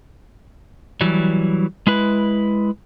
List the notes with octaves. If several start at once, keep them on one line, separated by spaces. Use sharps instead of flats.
E3 F#3 G3
G#3 E4 B4